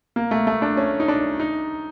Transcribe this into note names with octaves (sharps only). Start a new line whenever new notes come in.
A#3
A3
A3
D4
C#4
D#4
D4
D#4